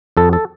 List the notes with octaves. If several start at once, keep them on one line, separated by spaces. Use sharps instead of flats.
F2 A4
A4